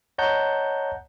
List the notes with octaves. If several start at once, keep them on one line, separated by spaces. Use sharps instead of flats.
C#5 D#5 F#5 A5 A#5 G6